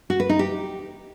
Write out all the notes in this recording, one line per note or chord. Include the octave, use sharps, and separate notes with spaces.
F#4
B4
D#4
G4